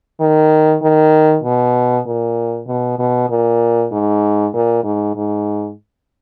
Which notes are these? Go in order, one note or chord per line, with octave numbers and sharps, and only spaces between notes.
D#3
D#3
B2
A#2
B2
B2
A#2
G#2
A#2
G#2
G#2